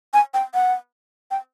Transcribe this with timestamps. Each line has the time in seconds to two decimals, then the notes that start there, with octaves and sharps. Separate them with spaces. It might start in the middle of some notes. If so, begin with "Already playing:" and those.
0.14 G#5
0.34 G5
0.54 F#5
1.31 G5